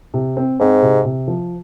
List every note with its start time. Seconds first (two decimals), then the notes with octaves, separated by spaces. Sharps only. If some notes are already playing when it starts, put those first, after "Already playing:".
0.14 C3
0.37 C4
0.60 G#2 C4
0.82 C3
1.05 C3
1.28 F3